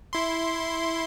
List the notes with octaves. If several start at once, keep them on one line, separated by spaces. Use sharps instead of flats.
E4 C6